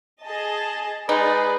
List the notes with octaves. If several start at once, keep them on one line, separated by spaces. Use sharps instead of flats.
G#4 D#5 A5
G#3 D#4 G#4 B4 D5